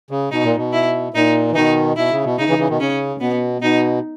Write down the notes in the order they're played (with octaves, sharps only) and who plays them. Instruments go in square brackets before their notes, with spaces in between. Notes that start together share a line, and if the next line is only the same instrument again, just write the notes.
[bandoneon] C#3
[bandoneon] B2 [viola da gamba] D#4
[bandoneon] A#2
B2
[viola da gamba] E4
[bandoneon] A#2 [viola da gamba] D#4
[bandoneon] E3
[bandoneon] B2 D#3 [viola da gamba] D#4
[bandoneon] B2 [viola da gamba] E4
[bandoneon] C#3
B2
[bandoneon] C#3 [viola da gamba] D#4
[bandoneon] C#3 E3
C#3 E3
B2 D#3
[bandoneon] C#3 [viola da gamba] C#4
[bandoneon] B2 [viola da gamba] B3
[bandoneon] B2 [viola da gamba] D#4